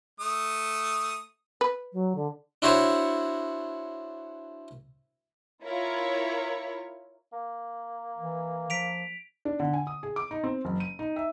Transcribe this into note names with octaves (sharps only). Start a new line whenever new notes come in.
A3 D#6
B4
F#3
D3
D4 E4 F#4 C5 C#5
E4 F4 A#4 C#5
A#3
E3
F3 B6 D7 F7
D4
D3
G#5
D#6
G#4
D6
D#4
C4
F#1
D#7
D#4
E5